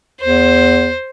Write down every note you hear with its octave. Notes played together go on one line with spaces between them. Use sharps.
E2 C5